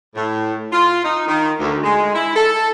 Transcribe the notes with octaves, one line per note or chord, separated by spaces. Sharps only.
A2
F4
D#4
D#3
D2
G#3
E4
A4